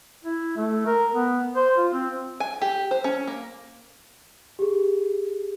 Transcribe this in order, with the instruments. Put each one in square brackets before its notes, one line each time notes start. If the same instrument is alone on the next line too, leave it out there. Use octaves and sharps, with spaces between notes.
[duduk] E4
A3
A#4
B3
C5
F4
C4
[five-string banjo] G#5
G4
C5
C#4
A#3
[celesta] G4 G#4